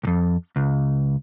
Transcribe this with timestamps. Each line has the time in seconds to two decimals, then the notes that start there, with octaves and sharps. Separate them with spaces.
0.03 B1 F2
0.56 C#2